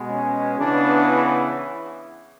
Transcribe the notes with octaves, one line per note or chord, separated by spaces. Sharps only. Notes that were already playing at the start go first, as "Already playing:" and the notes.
Already playing: B2 G#3 B3
C#4
C#3 E3 B3 D4
E4